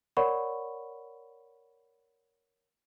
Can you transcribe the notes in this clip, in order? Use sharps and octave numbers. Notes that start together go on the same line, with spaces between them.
A#4 C#5 D5 F#5 B5 C#6